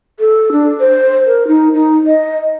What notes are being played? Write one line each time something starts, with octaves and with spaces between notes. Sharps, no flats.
A4
D4
C5
A#4
D#4
D#4
D#5